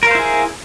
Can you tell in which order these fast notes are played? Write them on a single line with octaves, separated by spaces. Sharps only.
A#4 F5 C5 E4 G#4